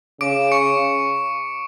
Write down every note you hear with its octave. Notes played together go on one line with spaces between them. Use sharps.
C#3 D6 D7
C#6 C#7